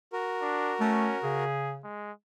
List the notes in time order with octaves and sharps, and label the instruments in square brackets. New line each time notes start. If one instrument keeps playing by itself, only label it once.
[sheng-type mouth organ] F#4 A#4
[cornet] D4
[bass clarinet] A3 [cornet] C#4
[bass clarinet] C#3 [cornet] G#4
[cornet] G#3